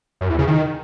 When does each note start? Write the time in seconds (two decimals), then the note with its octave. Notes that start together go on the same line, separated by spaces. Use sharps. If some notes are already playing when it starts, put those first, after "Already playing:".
0.21 F#2
0.30 E2
0.39 C#3
0.47 D#3